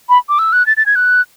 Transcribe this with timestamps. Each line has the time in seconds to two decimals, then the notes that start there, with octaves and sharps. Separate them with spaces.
0.09 B5
0.29 D6
0.39 E6
0.53 F#6
0.67 A6
0.77 A6
0.86 G#6
0.96 F#6